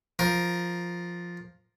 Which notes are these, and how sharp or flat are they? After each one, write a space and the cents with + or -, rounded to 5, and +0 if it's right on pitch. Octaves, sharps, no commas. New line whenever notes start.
F3 +0 A#4 +10